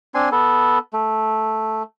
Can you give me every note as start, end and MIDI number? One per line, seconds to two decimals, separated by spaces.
0.15 0.29 60
0.15 0.29 62
0.15 0.29 80
0.15 0.29 84
0.32 0.79 59
0.32 0.79 69
0.93 1.83 57